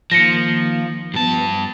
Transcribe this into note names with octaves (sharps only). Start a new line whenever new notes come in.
D#3 F3 A#3 A#6 C#7
G2 F3 B3 A5